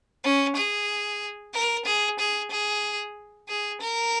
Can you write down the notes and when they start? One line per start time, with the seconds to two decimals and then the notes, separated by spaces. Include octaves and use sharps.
0.24 C#4
0.56 G#4
1.54 A#4
1.86 G#4
2.19 G#4
2.51 G#4
3.49 G#4
3.81 A#4